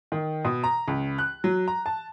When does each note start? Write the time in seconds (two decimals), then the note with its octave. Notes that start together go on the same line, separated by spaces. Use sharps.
0.12 D#3
0.45 B2
0.64 A#5
0.88 C#2
1.18 F#6
1.44 F#3
1.68 A#5
1.86 A5